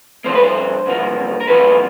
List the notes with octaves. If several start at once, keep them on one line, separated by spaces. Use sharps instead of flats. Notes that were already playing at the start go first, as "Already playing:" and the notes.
G2 D3 F3 A#3 C5
B4
C5
G2 D3 F3 A#3
A#4
G2 D3 F3 A#3 B4